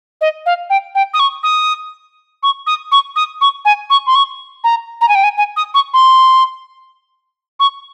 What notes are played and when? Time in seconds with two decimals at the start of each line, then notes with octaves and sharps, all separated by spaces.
0.21 D#5
0.46 F5
0.70 G5
0.95 G5
1.14 D#6
1.20 C#6
1.43 D#6
2.43 C#6
2.67 D#6
2.92 C#6
3.16 D#6
3.41 C#6
3.65 G#5
3.90 C#6
4.07 C6
4.15 C#6
4.64 A#5
5.01 A#5
5.09 G#5
5.15 G5
5.24 G#5
5.37 G#5
5.57 D#6
5.74 C#6
5.94 C6
7.60 C#6